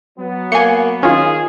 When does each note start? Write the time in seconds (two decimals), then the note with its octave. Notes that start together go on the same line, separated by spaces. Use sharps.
0.18 F#3 B3
0.52 A#3 G#5 C#7
1.03 D#3 C#4 F4 G#4